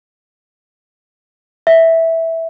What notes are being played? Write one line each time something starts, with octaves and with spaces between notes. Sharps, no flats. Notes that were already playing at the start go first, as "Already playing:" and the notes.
E5